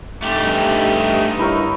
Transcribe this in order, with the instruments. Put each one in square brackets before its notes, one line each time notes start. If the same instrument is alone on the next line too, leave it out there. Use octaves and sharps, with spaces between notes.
[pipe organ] G2 D#4 [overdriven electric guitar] A3 G4
[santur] E4 A#4 C#5